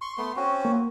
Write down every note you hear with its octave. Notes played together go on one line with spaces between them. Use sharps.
C6 C#6
A3 B3 C6
C4 C#4 F#4
A#3